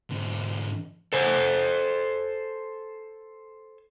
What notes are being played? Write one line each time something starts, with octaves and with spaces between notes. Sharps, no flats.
G#2 D3
A4 C5 G#5